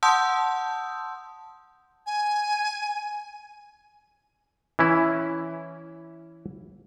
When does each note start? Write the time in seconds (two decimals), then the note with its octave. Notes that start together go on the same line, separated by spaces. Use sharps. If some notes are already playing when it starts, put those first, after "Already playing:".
0.03 F#5 A5 C6 D#6 E6 G6
2.06 G#5
4.79 E3 C#4 E4